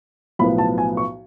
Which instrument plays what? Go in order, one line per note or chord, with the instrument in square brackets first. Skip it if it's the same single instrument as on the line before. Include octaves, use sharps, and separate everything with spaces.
[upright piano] B1 A2 F3 B3 B5
A5
G#5
C#6